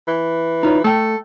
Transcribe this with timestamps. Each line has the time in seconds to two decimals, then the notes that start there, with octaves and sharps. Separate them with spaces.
0.08 E3
0.63 D#4 F4 C#5
0.84 A3 A4 G5